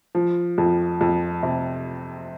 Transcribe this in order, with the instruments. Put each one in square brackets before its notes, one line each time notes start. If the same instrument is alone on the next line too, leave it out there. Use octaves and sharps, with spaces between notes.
[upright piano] F3
F2
F2
C3